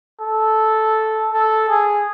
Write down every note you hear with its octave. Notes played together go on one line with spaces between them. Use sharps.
A4
A4
G#4